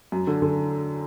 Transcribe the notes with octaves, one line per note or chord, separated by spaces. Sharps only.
F#2
D3
D3